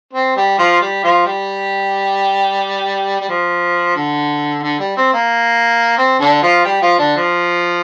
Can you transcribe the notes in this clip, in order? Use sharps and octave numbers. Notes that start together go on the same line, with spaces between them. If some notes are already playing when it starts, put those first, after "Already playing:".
C4
G3 G4
F3 F4
G3 G4
F3 F4
G3 G4
G3
F3
D3
D3
G3
C4
A#3
C4
D3 D4
F3 F4
G3 G4
F3 F4
D3 D4
F3